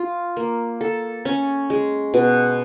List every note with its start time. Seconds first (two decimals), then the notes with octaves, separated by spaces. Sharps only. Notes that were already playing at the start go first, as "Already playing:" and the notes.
Already playing: F4
0.37 A#3
0.81 A4
1.25 C#4
1.70 G#3
2.14 B2